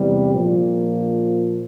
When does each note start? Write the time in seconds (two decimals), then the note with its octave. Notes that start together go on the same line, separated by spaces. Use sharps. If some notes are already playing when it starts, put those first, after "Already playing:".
Already playing: E2 C3 G3
0.32 A#1 A#2 F3